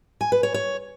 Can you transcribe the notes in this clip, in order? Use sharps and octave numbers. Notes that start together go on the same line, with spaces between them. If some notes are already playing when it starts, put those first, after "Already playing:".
G#5
B4
C#5
C#5